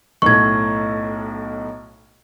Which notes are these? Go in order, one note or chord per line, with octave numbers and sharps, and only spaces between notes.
B1 A2 C#6 G#6